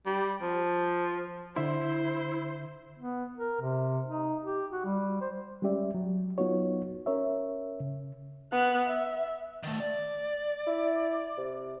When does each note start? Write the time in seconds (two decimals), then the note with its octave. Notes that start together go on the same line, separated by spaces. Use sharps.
0.06 G3
0.42 F3
1.56 D3 E4 C5 E5 C6
2.98 B3
3.37 A#4
3.61 C3
4.06 D#4
4.43 G4
4.71 F#4
4.85 G3
5.21 C5
5.62 G3 G#3 C#4 G4 D5 E5
5.95 F#3
6.38 F#3 B3 D#4 F4 F#4 C#5
7.06 C#4 A#4 C#5 E5
7.80 C#3
8.52 B3 F#6
8.85 E5
9.63 D#3 A3
9.80 D5
10.67 E4
11.38 C3